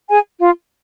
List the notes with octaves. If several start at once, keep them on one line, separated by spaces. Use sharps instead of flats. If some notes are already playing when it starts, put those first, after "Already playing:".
G#4 G#5
F4 F5